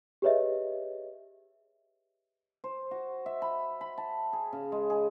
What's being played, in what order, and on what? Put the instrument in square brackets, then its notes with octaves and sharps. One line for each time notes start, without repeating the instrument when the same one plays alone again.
[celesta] G4 G#4 B4 C#5 D#5 E5
[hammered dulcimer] C5
F#4
E5
B5
B5
A5
G#4
C#3
G#3
G#4